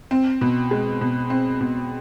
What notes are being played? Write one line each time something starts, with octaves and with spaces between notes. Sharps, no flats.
C4
B2
G#3
B2
C4
B2